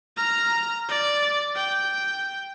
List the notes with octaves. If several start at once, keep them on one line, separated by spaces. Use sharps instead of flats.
A#5 F6
D5
G5